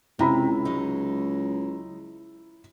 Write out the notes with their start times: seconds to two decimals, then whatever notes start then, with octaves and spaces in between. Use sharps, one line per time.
0.19 C#2 C3 E4 A#5 B5
0.65 F#3 G#3 D#4